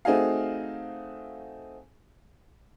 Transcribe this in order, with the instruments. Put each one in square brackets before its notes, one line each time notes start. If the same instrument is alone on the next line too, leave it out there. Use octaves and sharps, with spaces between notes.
[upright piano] A3 C4 D#4 F#4 G#4 F5